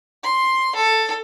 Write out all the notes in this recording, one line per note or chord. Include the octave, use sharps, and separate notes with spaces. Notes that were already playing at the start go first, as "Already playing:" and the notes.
C6
A4